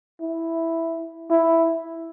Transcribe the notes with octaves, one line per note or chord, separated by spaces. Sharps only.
E4
E4